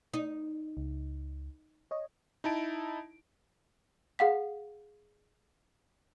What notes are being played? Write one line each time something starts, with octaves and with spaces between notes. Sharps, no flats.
D#4
C#2
C#5 D#5
D#4 E4 A5 D7
G#4 F5 F#5 B6